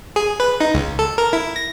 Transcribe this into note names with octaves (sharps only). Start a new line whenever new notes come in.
G#4
B4
D#4
C#2
A4
A#4
E4
A#6